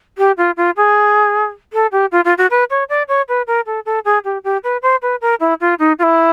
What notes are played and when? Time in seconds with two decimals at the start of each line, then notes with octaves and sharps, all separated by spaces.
0.18 G4
0.37 F4
0.57 F4
0.77 G#4
1.73 A4
1.92 G4
2.12 F4
2.25 F4
2.38 F#4
2.50 B4
2.70 C#5
2.89 D5
3.08 C#5
3.28 B4
3.47 A#4
3.66 A4
3.86 A4
4.05 G#4
4.24 G4
4.44 G4
4.64 B4
4.82 C5
5.02 B4
5.21 A#4
5.40 E4
5.61 F4
5.79 D#4
5.99 F4
6.03 E4